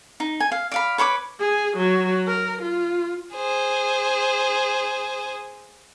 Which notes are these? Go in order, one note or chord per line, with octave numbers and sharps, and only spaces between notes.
D#4
G#5
F5
D5 F5 B5
B4 C#5 B5 D6
G#4
F#3
A#4
F4
G#4 C5